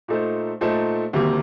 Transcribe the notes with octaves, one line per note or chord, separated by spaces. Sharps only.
A#2 A3 D#4 A4 C5
A#2 A3 D#4 A4 C5
D2 C3 D#3 G3 A#3